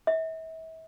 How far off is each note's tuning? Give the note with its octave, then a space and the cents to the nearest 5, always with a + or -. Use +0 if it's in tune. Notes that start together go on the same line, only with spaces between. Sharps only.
E5 -35